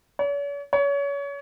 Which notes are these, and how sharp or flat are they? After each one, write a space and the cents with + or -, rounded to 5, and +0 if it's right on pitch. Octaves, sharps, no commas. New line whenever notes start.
C#5 +45
C#5 +30